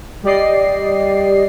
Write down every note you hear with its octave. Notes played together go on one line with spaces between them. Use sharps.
G3 G4 D5 D#5 C7